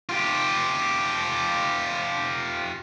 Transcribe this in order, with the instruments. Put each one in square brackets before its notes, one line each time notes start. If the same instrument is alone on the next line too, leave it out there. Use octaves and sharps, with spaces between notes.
[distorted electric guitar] F4 G4